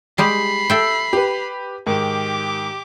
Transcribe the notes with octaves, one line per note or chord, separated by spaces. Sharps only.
G3 G#3 G4 B5 C7
A4 E5 G5
G4 B4
G#2 D#3 G4 D6